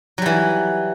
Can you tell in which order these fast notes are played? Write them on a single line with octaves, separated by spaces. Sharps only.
F#3 G3 E3